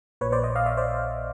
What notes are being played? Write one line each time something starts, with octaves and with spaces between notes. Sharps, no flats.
A#1 A#2 B4 C#5
C5 D5
C#5 D#5
D#5 F5
D5 E5
C5 D5